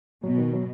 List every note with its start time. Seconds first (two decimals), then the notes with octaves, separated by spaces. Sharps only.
0.23 B2 F#3
0.38 D#3
0.53 F#3